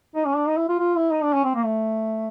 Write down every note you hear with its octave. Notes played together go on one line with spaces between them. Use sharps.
D#4
C#4
D4
D#4
E4
F4
F4
E4
D#4
D4
C#4
C4
A#3
A3